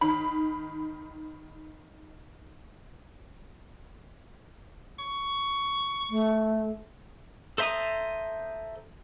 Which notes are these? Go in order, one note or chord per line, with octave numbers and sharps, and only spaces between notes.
D#3 B5
C#6
A3
A4 C5 E5 A#5 D#6